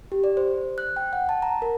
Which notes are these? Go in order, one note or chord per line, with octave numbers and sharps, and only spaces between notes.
G4
D5
C5
F#6
G5
F#5
A5
A#5
A#4